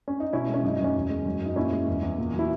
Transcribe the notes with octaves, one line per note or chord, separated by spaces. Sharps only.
C#4
D#4
B2 C#4 E4
G#3
C#4
F#2 D#4
D#4
F#2 C#4
E2
G#3
F#2
F#2 D#4
A#2 C#4 E4
G#3
E2
E2
A#2
F#3
E4